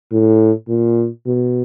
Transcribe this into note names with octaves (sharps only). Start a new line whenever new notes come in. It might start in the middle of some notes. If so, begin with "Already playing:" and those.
A2
A#2
B2